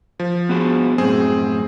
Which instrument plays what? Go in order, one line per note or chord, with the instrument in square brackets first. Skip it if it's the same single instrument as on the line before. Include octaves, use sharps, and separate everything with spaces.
[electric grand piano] F3
[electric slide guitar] B3 F#4 G#4
[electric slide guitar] F#2 A2 [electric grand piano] C4 G#4